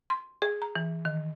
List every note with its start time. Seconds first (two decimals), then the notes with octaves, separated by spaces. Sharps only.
0.10 C6
0.42 G#4
0.62 A#5
0.75 E3
1.05 D#3